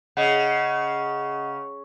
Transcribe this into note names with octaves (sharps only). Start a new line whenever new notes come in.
C#3 D#5 F#5